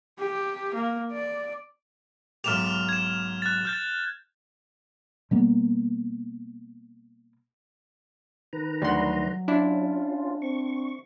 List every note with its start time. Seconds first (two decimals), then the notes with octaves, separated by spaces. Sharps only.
0.19 G4
0.74 A#3
1.12 D5
2.44 B1 G#2 G4 F6 E7 F7
2.89 G#6 E7
3.42 F#6 A6
3.65 F6 G6 A6
5.31 B2 G3 A#3 B3
8.53 D#3 B4 A#5
8.82 D2 F#3 G3 F#5 C6
9.48 C#4 D4 E4 F4
10.42 C4 C#6